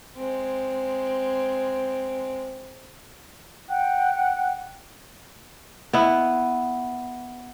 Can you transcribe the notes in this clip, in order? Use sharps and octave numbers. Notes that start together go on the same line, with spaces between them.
G#3 C4
F#5 G5 F#6
B3 E4